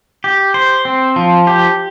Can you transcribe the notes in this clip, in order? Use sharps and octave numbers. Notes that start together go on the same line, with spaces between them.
G4
C5
C4
F3
G4